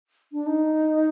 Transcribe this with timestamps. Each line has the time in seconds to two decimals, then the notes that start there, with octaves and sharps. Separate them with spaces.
0.32 D4
0.46 D#4